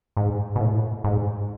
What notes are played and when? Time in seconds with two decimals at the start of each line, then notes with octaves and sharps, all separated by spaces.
0.17 G#2
0.56 B2
0.60 A2
1.04 G#2